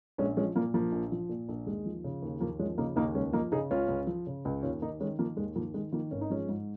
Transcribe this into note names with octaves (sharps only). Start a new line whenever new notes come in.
A#1 G#3 C#4
F3 G#3 C#4
A#2 F3 A#3
A#1 F3 A#3
A#1
F3
A#2
A#1
D#2 G#3
F3
C#3
D#2
D#2 F3 A#3
F3 G#3 C#4
C#3 A#3 D#4
D#2 A#3 D#4
C#2 G#3 C#4
F3 A#3 D#4
C#3 D#4 G#4
C#2 C#4 F4
C#2
F3
C#3
C#2
D#2 C#4 F4
D#2 A#3 D#4
D#3 G#3 C#4
D#3 F3 A#3
D#2 G#3
D#2 F3 A#3
D#3 G#3
D#3 F3 A#3
G#1 C#4
D#4
F3 G#3 C#4
G#2